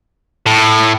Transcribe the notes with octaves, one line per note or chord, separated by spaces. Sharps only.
A2